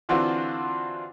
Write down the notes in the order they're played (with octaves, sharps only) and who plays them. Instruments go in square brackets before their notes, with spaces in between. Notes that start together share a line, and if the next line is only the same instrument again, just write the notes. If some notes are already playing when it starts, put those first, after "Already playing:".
[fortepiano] D3 E3 C4 D4 F4 F#4